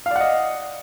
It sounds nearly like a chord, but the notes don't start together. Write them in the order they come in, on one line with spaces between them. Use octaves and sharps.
F5 D5 F#5 D#5